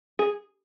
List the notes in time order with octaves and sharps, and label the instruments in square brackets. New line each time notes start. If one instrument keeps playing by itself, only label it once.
[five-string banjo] G#4